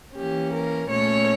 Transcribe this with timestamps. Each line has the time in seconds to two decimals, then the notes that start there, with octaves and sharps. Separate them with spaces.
0.15 E3 A#3 C#4 G4
0.52 A#4
0.89 A#2 A3 C#4 C#5